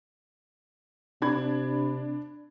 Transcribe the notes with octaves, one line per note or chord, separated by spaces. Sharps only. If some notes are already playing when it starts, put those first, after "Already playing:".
C3 D4 B5 G#6